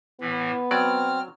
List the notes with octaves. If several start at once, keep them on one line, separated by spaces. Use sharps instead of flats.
A2 E3 B3
F#3 C4 D5 F6